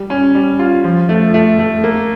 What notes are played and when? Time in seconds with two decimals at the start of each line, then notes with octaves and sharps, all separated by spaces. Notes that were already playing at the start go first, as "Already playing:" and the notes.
Already playing: G3
0.10 C#4
0.35 G3
0.59 F4
0.84 F3
1.09 A3
1.34 A3
1.59 A3
1.84 A#3